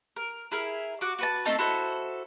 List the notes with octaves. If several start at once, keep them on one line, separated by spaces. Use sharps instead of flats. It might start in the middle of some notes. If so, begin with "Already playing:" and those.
A#4
E4 G#4 A#4
F#4 D6
F#4 B4 A5
A3 C4 D#4 A5
E4 F#4 A4 C5